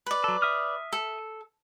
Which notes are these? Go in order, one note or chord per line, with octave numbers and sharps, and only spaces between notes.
B4 D5
F#3 A4
E5 D#6 F6
A4